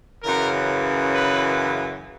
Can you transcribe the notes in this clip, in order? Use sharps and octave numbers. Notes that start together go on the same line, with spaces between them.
F#2 C#3 E3 A#4
B4